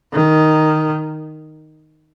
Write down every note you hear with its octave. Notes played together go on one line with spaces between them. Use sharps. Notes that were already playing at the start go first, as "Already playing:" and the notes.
D#3